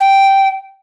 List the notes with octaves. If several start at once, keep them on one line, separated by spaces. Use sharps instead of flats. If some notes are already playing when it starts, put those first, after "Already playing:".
G5